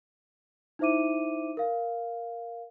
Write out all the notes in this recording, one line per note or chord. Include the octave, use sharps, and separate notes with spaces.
D#4 E4 C5 E5 D6 D#7
A#4 F5